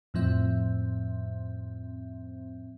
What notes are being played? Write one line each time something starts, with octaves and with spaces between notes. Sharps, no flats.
F2 A2 F3 C4 E5